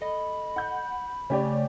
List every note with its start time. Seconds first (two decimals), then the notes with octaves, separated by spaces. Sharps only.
0.01 A4 D#5 B5
0.56 F#5 G6
1.30 C#3 A3 C#4 G4 C#5 D5